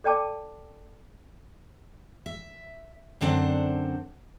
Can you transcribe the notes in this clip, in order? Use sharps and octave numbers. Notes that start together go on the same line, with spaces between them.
A4 D5 G5 A5 D6
E5
F#2 D3 C4 D4 C5 F#5